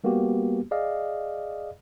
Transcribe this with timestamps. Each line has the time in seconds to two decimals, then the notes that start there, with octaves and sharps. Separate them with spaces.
0.04 G3 A#3 B3 F#4 G4
0.71 G#4 D5 D#5 F5